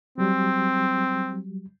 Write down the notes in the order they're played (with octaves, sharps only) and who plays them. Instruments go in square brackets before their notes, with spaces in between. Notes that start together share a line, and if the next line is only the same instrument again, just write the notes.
[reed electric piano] F#3 G3 [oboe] C4